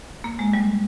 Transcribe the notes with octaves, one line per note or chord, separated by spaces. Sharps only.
A#3
G#3
G3